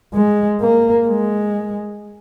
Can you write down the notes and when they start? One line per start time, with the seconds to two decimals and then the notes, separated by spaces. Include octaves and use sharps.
0.14 G#3
0.61 A#3
1.08 G#3